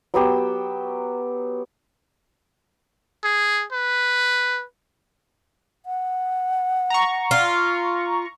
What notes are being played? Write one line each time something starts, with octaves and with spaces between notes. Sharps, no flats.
F#3 B3 G4 E6
G#4
B4
F#5
A#5 C#6
F4